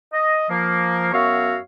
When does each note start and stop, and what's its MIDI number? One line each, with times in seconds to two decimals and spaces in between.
0.13 0.49 75
0.49 1.09 53
0.49 1.09 58
1.13 1.57 42
1.13 1.57 59
1.13 1.57 66
1.13 1.57 73
1.13 1.57 76
1.13 1.57 77